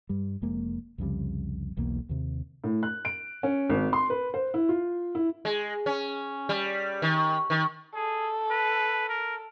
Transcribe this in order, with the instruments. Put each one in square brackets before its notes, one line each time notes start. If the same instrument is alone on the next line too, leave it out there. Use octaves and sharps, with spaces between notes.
[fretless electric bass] G2 G3
F1 F2 G#3 A#3
C2 F2 C#3 G3
E1 B1 E2 A#3
D#2 C3
[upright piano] A2
F#6
D7
C#4
G#1
C6
B4
C5
E4
F4
E4
[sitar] G#3
C#4
G3
D#3
D#3
[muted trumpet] G#4 [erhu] A4
[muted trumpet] B4
A#4